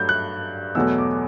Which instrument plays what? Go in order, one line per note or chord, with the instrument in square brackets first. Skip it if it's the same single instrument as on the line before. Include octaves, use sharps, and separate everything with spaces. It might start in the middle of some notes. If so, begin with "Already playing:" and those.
Already playing: [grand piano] G2 F#3 A3 D4 G6
F#6
E2 B2 F#3 A3 E6
D6